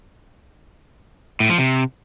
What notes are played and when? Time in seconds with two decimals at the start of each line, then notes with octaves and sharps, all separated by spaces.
1.40 A2
1.49 F3
1.58 C3